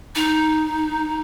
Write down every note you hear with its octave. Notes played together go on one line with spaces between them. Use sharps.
D#4